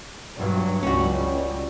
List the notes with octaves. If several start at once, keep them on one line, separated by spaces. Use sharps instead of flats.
G2 F#3
C#2 G3 C#4 F#4